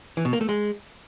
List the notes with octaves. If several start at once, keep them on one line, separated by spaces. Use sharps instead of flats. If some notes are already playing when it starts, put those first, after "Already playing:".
E3
B2
A#3
A3
G#3